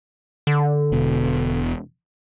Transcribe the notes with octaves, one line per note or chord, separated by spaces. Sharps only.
D3
E1 B2